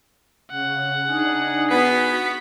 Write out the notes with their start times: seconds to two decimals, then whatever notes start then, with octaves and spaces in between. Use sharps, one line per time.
0.51 C#3 F#5
1.06 D4 D#4 G#4
1.71 B3 F#4 B6